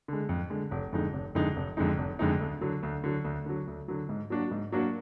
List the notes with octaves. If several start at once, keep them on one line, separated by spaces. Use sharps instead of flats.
D3 G#3
F2
D3 G#3
F1
F2 D3 G#3 D#4
F1
F2 D3 G#3 D#4
F1
F2 D3 G#3 D#4
F1
F2 D3 G#3 D#4
D2
D3 F#3
D2
D3 F#3
D2
D3 F#3
D2
D3 F#3
G#2
F#3 A#3 D4 F#4
G#2
F#3 A#3 D4 F#4